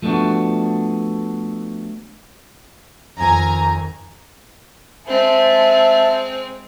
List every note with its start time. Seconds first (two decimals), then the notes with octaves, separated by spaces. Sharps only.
0.02 F3 A3 B3 D4 F#4
3.18 F2 D#3 G#5 A#5
5.07 G#3 C4 E5 A5